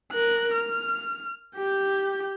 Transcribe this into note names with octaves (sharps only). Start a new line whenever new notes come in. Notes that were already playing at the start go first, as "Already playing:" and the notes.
A#4 F#6
F6
G4 G6